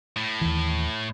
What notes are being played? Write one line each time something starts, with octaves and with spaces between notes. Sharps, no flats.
A2
D#2 E3